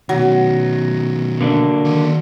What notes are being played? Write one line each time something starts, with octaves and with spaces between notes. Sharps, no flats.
B2 D#3 F#3
D3 A#3 D4
D#3 F#5